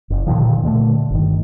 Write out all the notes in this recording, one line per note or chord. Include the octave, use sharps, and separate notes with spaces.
F#1
A#2 D3 D#3 F3
A#2 D3 G3 A3
G1 D#3